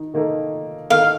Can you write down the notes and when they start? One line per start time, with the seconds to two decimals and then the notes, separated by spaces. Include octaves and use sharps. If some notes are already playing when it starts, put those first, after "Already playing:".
Already playing: D#3 D#4
0.14 D#3 A#3 D#4 A4
0.90 D#3 A#3 D#4 A4 F5